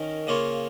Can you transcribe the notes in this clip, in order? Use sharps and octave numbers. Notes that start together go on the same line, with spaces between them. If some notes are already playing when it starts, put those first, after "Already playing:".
Already playing: D#3 C#4 A#4 D#5
C#3 A#3 F4 C#5